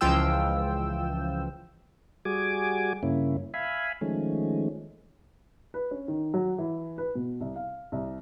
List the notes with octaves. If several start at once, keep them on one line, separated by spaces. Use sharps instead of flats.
C#2 E3 F3 F4 G5 E6
G3 F#4 G#4 G#5 D6
G2 C#3 A#3 C#4 E4
E5 F5 G#5 B5
D#3 F3 G#3 A3 C#4
B4
C#4
D#3
F#3
E3
B4
B2
C2
F5
C2